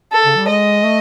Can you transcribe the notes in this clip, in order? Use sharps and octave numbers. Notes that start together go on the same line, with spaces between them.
A4
C#3
G3
G#3 D#5
A3